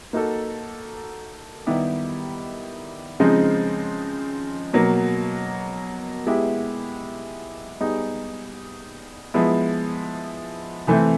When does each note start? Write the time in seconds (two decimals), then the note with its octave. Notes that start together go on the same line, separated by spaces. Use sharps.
0.13 A#3 D#4 F#4 A4
1.66 D#3 G3 B3 E4 G4
3.20 C#3 F3 G#3 C4 D#4
4.73 B2 F#3 A#3
6.27 G#3 B3 E4 G4
7.80 G3 B3 D#4 G#4
9.34 F3 G#3 B3 E4
10.87 C3 E3 A3 C4